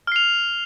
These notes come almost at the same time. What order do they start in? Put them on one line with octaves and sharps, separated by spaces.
F6 C7 F7